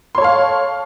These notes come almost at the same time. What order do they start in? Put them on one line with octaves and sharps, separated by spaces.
C6 C#5 A4 F5